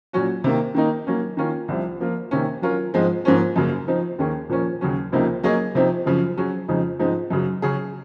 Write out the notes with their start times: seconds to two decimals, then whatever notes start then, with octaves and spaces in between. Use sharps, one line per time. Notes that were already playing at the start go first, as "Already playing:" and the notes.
0.13 A#2 F#3 C#4 F#4
0.44 C3 D#3 A#3
0.75 D#3 A#3 D#4
1.07 F#3 A#3 C#4
1.37 D#3 A#3 C#4 F4 A#4
1.68 C2 C3 F3
2.00 F3 A#3 F4
2.31 C3 D#3 A#3 C#4
2.62 F#3 C#4 F4 A#4
2.94 G#2 F3 G#3 C4
3.25 G#2 F3 A#3 C#4
3.56 F#2 C#3 F#3 A#3
3.88 F3 C4 D#4
4.19 D#2 D#3 A#3 C#4 G#4
4.49 A#2 F3 A#3 C#4
4.81 D#2 C#3 F#3 C#4
5.12 C#2 C3 F3 A#3 D#4
5.43 F#3 A#3 C#4 G#4 D#5
5.75 C3 F3 C4 D#4
6.06 F#2 C#3 F3
6.37 F#3 C#4 G#4
6.69 F2 C#3 F3 G#3 D#4
6.99 G#2 F3 G#3 C4 D#4
7.30 F#2 C#3 F#3
7.62 C#3 F#3 C#4 G#4